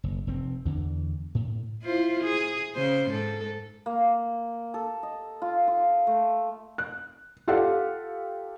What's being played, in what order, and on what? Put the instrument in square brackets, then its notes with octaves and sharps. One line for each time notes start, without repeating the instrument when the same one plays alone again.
[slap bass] F#1
F1 C4
E2 D3 E3
A2
[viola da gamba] E4 F4 C5
G#4
C#3 C5
G#2 A4
[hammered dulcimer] A#3
A4
D#5
F4
F4
A3
[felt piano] F#6
F4 G4 A4 D5 F5 F#5